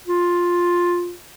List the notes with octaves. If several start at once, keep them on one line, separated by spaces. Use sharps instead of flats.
F4